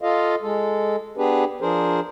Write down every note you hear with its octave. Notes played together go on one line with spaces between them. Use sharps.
F4 A4 D#5 F5
G#3 A4
B3 D4 G4 G#4 B4
F3 D4 G#4 A#4 C5